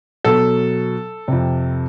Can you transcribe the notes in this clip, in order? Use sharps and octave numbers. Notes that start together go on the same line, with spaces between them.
B2 F#3 A4
F2 C3